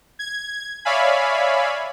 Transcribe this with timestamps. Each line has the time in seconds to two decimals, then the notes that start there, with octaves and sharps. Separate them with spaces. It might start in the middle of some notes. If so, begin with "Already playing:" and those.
0.19 G#6
0.85 C#5 D5 E5 F5 G#5 B5